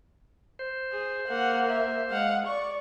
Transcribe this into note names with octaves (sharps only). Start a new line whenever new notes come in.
C5
G#4
A#3 F#5
E5
G#3 F5 F#5
D5 C#6